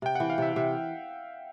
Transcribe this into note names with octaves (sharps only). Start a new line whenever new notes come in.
C3 G5
E3 F#5
F5
C3 E5
C3 E5